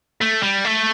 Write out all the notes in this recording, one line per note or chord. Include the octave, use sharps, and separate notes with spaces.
A3
G3
A3